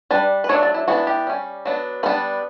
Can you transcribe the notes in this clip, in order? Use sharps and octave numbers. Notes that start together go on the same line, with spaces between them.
G3 D4 B4
B4
F#3 A3 D4 C#5
D5
E4
E3 B3 D4 F#4
G4
G3 C#4
F#3 B3 D4
G3 B3 D4 B4